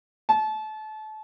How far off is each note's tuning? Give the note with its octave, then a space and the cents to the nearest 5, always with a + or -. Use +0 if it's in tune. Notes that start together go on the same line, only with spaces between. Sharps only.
A5 -30